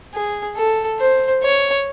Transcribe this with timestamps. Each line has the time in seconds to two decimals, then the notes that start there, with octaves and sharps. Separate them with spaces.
0.14 G#4
0.56 A4
1.00 C5
1.43 C#5